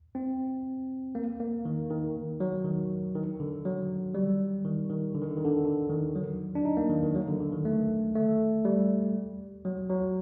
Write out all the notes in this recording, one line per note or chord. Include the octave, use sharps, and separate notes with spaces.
C4
A#3
A#3
D#3
D#3
F#3
D#3
D#3
D3
F#3
G3
D#3
D#3
D3
D#3
D3
D#3
D3
D3
D#3
F#3
D4
D#4
A#3
D#3
D#3
F#3
D3
D3
D#3
A3
A3
G3
F#3
F#3